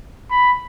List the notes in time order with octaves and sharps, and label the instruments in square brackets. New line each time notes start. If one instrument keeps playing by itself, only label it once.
[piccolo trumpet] B5